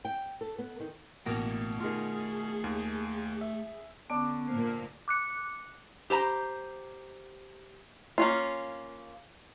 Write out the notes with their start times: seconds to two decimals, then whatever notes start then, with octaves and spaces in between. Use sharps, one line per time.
0.05 G5
0.41 A4
0.58 B3
0.80 D#3
1.26 A1 B2 A3 A#3 G5 A#5
1.80 D#3 F4 G#4
2.64 D#2
3.41 E5
4.10 D3 B3 C#4 D4
4.48 A#2 A#3 C5
5.08 D6 F#6 C#7
6.10 G4 C5 A5 A#5
8.18 A#3 C#4 F4